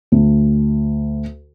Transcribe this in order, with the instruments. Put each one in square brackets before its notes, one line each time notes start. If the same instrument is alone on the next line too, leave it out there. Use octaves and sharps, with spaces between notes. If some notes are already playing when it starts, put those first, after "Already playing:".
[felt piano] D2